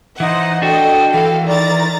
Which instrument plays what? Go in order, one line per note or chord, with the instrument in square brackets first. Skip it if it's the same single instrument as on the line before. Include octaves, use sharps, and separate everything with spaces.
[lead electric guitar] E3 [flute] D#4 [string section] C5 F#5
[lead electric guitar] D4 F#4 [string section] A4 D#5 [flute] G5
[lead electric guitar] E3 [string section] A4 F5
[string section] D#3 A#5 A6 [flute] D5